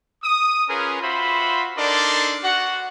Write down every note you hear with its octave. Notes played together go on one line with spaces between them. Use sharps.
D#6
C#4 F4 G#4 A#4 B4
F4 F#4 C5 E5 B5
D4 D#4 A4 A#4 D5 C6
F#4 F#5